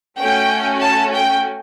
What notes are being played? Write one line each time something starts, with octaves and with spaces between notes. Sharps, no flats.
A3 C#4 F#4 G5
A5
G5